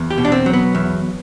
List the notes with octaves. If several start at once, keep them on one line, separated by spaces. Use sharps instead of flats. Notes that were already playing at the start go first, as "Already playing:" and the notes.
Already playing: E2
G4
B2
D4
C4
F#3
B3
E2